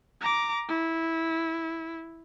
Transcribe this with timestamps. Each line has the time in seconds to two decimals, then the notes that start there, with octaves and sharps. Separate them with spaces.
0.21 A#5 D6
0.68 E4